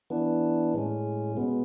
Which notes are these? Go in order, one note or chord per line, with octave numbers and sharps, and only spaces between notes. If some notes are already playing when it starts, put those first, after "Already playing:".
E3 B3 D4
A2 G#3 C#4
B2 G#3 B3